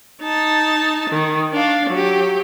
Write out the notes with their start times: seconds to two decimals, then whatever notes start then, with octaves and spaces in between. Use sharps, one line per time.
0.22 D#4 A5
1.10 D#3
1.53 D4 F5
1.90 F#3 G4